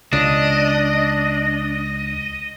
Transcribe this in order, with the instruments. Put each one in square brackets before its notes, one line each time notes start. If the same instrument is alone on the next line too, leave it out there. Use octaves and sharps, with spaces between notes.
[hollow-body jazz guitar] C#2 [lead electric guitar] D4 [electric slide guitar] D#5